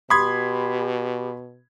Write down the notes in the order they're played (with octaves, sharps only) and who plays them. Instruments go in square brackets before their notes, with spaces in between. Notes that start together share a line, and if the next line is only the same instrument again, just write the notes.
[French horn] B2 [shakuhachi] G4 [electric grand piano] B5 C6 G#6 [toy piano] D#6